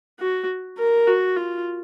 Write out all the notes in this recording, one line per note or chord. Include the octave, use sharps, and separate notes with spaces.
F#4
A#4
F#4
F4